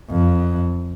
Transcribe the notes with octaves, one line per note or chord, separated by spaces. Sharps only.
F2